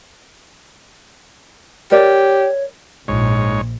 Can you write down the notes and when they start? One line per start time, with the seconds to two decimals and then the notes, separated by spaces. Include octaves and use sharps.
1.92 G4 A#4 C#5 D5
3.08 A#1 G#2 C#5